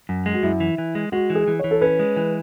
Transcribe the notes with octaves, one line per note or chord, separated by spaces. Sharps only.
F#2
G#3
F#4
F#2 E4
E3
E3
G#3
G#3 F#4
E3
G#4
E3
E3 C#5
A4
C#4 B4
G#3
E3